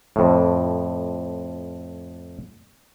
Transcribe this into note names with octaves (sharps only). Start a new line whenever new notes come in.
F2 A2